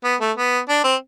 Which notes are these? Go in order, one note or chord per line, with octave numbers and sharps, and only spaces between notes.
B3
A3
B3
D4
C4